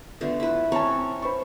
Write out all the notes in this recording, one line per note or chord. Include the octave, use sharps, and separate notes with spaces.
D3 A3 B3 F4
E4 B4
C4 C#4 C#5 A5 A#5
C5 B5 C#6